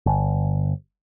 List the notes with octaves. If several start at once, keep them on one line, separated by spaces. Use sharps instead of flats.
G1